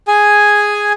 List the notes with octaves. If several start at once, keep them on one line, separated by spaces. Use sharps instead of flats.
G#4 G#5